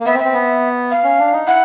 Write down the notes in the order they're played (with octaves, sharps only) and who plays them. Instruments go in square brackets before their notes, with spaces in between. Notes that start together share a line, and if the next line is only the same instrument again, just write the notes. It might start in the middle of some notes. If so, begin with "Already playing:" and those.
[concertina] A#3
[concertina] B3 [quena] E5
[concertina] C4
[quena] E5
[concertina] C4
B3
[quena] F5
[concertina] C#4
D4
D#4
[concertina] E4 [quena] F#5